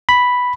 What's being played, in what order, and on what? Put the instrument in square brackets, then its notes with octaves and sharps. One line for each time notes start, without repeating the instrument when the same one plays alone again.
[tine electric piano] B5